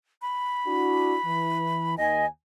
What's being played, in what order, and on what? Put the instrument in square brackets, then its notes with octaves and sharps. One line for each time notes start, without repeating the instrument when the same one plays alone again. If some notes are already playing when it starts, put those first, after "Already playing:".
[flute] B5
[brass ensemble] D4 E4 F#4
E3
[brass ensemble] D#2 G#5 [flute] D#5